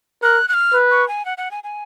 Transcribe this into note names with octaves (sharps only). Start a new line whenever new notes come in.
A#4 F#6
F#6
F6
B4
C#6
G#5
F#5
F#5
G#5
G#5